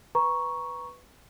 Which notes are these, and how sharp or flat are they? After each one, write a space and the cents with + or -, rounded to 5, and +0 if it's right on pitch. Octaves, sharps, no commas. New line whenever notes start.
B4 +0 A#5 +20 C#6 +0